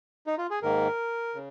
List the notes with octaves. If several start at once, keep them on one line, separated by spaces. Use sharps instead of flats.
D#4
F4
G#4
G#2 D#3 A#3 A#4
C#3